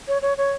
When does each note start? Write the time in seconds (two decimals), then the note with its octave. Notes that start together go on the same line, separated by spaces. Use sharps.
0.08 C#5
0.22 C#5
0.37 C#5